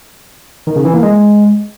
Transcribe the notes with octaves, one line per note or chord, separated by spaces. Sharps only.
D#3
C#3
E3
A#3
G#3